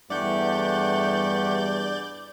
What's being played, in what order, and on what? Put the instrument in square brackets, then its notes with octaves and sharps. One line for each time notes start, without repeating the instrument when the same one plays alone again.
[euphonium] E2 [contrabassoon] G2 [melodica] A3 G4 F#5 [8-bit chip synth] D5 G6